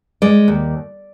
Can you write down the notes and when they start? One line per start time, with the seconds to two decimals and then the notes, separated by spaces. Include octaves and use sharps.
0.22 G#3 D5
0.48 D#2